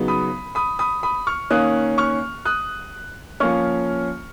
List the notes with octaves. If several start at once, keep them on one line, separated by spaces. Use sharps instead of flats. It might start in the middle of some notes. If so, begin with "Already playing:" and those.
Already playing: C#3 F#3 B3 D#4
B5 D#6
B5 D#6
B5 D#6
B5 D#6
C#6 F6
D#3 A#3 C#4 D#6 F#6
C#6 F6
D#6 F#6
F3 A#3 C#4 C#6 F6